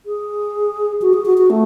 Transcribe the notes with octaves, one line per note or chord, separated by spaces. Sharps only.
G#4
F#4
G#4
F#4
F#4
A3